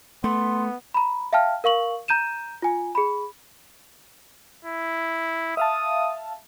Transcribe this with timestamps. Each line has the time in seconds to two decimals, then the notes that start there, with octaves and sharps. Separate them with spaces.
0.24 A3 B3 C6
0.94 A#5 B5
1.33 E5 F5 G5 A5 F6
1.64 A#4 F5 C#6 F#7
2.08 A#5 G6 D#7 E7
2.62 F4 G#5
2.95 G#4 B5
4.65 E4
5.57 E5 F5 A5 D#6